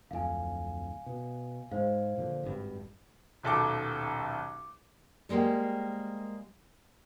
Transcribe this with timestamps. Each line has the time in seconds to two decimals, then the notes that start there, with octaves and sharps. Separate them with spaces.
0.11 D1 F2 F5 G#5
1.06 B2
1.71 G#2 G#3 C5 F5
2.17 A#2 D3 F3
2.43 G#1 G2
3.43 D#1 B1 A4 D6
5.29 G3 G#3 A#3 C5 G5